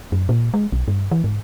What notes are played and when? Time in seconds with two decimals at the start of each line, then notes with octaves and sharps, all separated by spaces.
0.12 F#2
0.29 A#2
0.54 G#3
0.72 B1
0.88 G2
1.11 E3
1.24 G#2